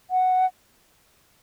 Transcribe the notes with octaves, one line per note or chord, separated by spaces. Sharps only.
F#5